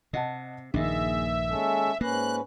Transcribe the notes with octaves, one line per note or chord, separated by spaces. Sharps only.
C3 D#5 F#5 A5
A#1 G2 D#3 A#3 G#4 E5
G#3 C#4 A4
G#2 A#3 C#4 B4 F#6